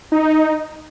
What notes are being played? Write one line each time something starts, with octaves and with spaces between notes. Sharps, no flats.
D#4